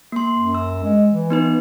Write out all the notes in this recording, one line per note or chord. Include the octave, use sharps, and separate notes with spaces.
A#3 C6
F#2
E6
G#3
E3
B3 D#4 B4